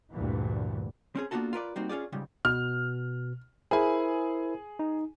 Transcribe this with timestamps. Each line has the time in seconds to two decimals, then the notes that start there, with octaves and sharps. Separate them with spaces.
0.12 D2 G2 A#2 E3
1.15 C4 C#4 G#4
1.31 A#3 B3 D4 F4 F#4 A4
1.53 F4 A#4 B4 D5
1.76 G3 A#3 C4 D#4 F#4
1.89 C#4 F4 G#4 D5
2.12 C#2 G#2 C#3 G3
2.45 B2 F6
3.71 E4 G#4 A#4 C5 G#5
4.79 D#4